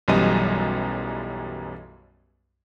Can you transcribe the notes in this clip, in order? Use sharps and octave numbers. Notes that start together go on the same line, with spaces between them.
B1 F#2 E3 G3 D#5 D#7